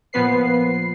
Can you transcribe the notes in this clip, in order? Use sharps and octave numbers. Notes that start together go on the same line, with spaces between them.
A#2 F3 B3 B4 C7